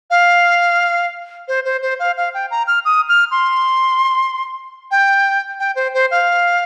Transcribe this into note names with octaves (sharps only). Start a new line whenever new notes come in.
F5
C5
C5
C5
F5
F5
G5
A#5
F6
D#6
F6
C6
G5
G5
C5
C5
F5